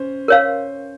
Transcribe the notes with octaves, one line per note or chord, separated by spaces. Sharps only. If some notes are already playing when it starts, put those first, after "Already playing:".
Already playing: C#4 C5
A#4 C#5 F5